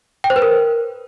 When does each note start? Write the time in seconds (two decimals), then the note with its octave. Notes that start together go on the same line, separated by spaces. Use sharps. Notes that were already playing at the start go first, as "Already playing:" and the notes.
0.24 G5
0.30 C5
0.36 B4
0.42 A#4